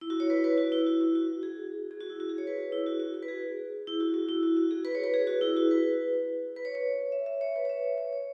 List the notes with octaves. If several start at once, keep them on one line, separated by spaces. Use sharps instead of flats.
E4
F#4
C#5
B4
B4
F#4
E4
F#4
F#4
F#4
G#4
G#4
F#4
E4
F#4
G#4
C#5
B4
F#4
E4
F#4
F#4
F#4
B4
G#4
E4
F#4
F#4
E4
F#4
F#4
G#4
B4
C#5
B4
G#4
F#4
E4
F#4
B4
B4
C#5
C#5
E5
E5
C#5
B4
C#5
E5
C#5
C#5
C#5